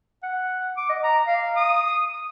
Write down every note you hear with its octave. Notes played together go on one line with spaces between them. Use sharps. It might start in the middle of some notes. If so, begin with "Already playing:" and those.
F#5
D6
D#5
A#5
F5
D#6